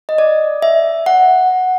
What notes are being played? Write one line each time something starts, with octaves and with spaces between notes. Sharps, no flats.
D#5
D5
E5
F#5